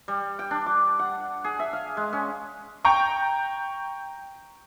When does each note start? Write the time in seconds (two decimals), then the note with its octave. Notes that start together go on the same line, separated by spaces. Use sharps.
0.08 G3
0.39 G5
0.51 D4
0.66 D6
0.99 F#5
1.44 G#4
1.59 E5
1.73 F5
1.97 G#3
2.13 C#4
2.85 G5 A#5 C#6